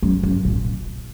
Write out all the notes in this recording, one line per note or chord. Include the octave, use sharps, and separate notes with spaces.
F#2
F#2
A#2